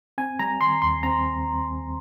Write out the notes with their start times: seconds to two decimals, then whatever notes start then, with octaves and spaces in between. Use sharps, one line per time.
0.18 C4 G#5
0.39 G3 A#5
0.60 D#3 C6
0.82 D#2 C6
1.03 C4 A#5